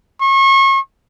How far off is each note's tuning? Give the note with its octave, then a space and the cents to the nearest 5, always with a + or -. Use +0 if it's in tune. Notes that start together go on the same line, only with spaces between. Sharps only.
C#6 -35